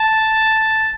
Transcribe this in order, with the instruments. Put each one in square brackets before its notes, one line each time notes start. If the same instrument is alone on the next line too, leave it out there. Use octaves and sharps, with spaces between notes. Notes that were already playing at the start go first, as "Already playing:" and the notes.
Already playing: [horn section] A5